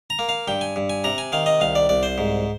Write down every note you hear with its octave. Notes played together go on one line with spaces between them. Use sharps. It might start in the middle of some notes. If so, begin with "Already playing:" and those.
A#5
A#3
F5
G2 G5
G#5
G2
G#5
C3 A#5
G#5
D#3 F5
D#5
C2 F5
D5
C2 D5
C5
G#2